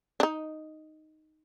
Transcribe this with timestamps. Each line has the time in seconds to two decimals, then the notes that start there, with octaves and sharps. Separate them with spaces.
0.20 D4
0.23 D#4